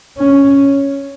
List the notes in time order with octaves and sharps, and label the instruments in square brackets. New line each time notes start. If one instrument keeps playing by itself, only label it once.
[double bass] C#4